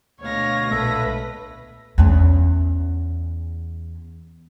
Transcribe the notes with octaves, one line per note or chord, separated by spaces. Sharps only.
D2 B2 C#5 F5 A#6
B1 A#2 G#3 A4 B4 E5
E2 C#4